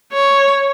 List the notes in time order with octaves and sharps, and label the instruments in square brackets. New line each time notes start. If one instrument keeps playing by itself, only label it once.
[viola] C#5